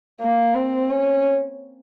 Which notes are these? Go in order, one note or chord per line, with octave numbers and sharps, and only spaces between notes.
A#3
C4
C#4